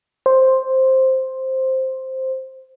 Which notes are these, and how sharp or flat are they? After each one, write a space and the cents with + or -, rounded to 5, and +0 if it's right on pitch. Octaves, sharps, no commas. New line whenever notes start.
C5 +5